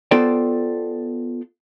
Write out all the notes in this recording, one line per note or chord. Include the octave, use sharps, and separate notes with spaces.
B3 F4 A4 C5 D5 G5